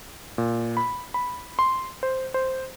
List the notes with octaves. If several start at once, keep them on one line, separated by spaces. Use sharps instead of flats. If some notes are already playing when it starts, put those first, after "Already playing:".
A#2
B5
B5
C6
C5
C5